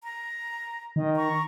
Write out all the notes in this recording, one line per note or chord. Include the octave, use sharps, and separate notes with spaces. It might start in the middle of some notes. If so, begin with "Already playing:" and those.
A#5
D#3 D#5
A#5 C#6